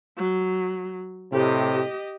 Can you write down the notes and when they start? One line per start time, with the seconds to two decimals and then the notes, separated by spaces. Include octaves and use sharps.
0.17 F#3
1.33 A2 C3 G4 D#5